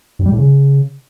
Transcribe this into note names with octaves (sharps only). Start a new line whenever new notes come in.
G2
G3
A2
C#3